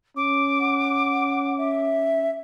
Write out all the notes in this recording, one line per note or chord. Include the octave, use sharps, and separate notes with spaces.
C#4 D6
F#5
E5